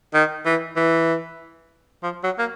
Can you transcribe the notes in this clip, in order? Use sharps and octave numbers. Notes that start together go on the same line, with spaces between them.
D#3
E3
E3
F3
F#3
A#3